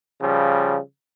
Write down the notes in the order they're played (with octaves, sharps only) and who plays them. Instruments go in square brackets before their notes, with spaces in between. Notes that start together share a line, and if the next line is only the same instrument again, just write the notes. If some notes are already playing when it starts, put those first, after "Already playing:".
[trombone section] C#3 F3 G3